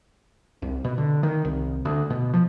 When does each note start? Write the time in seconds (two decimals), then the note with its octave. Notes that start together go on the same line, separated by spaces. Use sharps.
0.62 C2
0.84 B2
0.98 D3
1.23 D#3
1.45 C2
1.85 D2
2.10 B2
2.34 F3